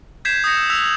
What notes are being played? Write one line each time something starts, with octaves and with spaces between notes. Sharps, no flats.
G6 G#6 B6 C7 E7
D#6 G6 A#6 C#7
E6
E6 F#6 B6 F7
E6